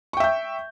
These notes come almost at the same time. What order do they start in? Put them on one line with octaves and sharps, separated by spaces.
C#6 G5 E5 G6